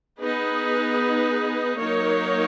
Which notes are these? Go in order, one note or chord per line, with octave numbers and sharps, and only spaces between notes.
B3 D#4 G#4 B4
F#3 A#3 D#4 A#4 C#5